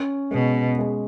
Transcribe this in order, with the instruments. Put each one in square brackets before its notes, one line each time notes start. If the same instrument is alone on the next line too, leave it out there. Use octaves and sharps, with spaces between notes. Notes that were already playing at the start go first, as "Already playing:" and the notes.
Already playing: [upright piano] C#4
[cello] B2 [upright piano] G#3
[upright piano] G#3